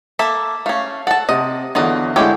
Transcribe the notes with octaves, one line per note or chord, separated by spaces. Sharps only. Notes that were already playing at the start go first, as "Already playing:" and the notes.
A#3 A4 E5
A3 C#4 F5
A4 F#5 A5
C3 D#5
E2 D3 F#3 F4 D#5
D3 G#3 E4 G4 C#5 G5